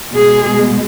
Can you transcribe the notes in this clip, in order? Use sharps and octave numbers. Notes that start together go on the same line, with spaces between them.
B2 G#3 G#4